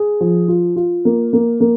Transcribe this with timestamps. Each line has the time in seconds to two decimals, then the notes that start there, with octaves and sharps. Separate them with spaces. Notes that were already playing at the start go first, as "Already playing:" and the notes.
Already playing: G#4
0.21 F3
0.48 F4
0.76 F4
1.05 A#3
1.33 A#3
1.60 A#3